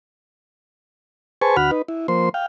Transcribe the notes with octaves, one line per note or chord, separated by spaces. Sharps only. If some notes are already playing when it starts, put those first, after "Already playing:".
G#4 B4 C5 G#5 A5 C#6
D2 F#4 F#5 B5 F6
D#4 B4
E4
F3 A#3 C5 C6
F5 G5